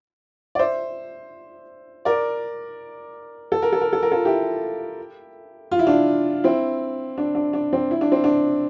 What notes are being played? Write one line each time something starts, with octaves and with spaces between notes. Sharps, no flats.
D5
C5 E5
A#4 D5
A4
A#4
A4
A#4
A4
A#4
F4 A4
E4 G4
F4
E4
D4 F4
C4 E4
D4
D4
D4
C4
E4
D4
C4
D4